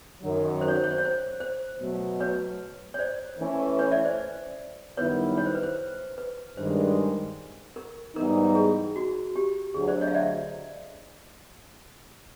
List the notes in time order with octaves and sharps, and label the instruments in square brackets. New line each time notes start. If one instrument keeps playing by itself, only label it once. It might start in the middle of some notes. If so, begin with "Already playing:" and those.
[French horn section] F#2 D#3 F#3
[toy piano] C5
C#5
C5
C#5
C5
C#5
C5
C5
[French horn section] B2 F#3 A3
[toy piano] B4 C#5
C#5
C5 D5
[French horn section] E3 A3 C#4
[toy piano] B4 C#5
D5 E5
C5 D5
[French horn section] F#2 D#3 G3 B3 E4 [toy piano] B4 C#5
[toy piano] C#5
C5
B4
C5
B4
[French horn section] G2 D#3 G#3 [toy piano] C5
[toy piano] A#4
[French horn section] G#2 E3 G3 B3 D#4 [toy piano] A#4
[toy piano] G#4
F#4
G4
[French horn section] D2 D3 F#3 [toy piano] G#4
[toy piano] C5 D5
C#5 D#5
F5
D5 E5